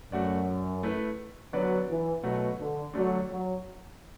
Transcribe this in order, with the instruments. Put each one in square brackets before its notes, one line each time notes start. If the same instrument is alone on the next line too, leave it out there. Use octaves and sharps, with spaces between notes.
[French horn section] F#2 [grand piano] A3 F#4 D5
[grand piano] A3 E4 B4
[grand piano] D3 B3 F#4 B4 D5 [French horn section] F#3
[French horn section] E3
[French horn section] B2 [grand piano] F#3 A3 F#4
[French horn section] D3
[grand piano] D3 A3 D4 [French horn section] F#3
[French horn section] F#3